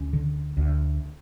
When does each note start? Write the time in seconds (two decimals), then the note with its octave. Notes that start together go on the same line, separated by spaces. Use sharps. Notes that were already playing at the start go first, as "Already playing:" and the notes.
Already playing: D2 C#4
0.13 D3
0.57 D2